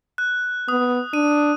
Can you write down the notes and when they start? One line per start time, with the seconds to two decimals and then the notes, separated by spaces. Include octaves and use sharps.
0.18 F#6
0.68 B3 D#6
1.13 D4 D#7